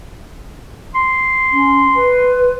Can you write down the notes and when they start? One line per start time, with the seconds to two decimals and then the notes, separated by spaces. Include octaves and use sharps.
0.95 C6
1.52 C#4
1.95 B4